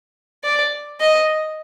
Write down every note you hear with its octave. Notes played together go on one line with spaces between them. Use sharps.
D5
D#5